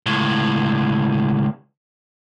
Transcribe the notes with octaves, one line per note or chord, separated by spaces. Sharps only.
C#2 A2